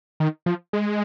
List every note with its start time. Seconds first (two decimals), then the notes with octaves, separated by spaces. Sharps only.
0.20 D#3
0.46 F3
0.73 G#3